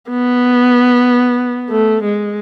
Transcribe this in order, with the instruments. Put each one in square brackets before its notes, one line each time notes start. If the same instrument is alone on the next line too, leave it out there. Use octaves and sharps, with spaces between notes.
[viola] B3
A3
G#3